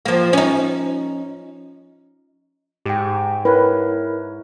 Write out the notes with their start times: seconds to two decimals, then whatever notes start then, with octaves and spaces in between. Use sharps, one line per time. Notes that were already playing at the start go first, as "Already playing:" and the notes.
0.05 F3 A#3
0.33 C#4 D#4
2.86 G#2 G4 G5
3.45 E4 A#4 B4 C#5